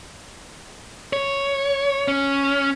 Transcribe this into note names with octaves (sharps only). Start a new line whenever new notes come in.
C#5
C#4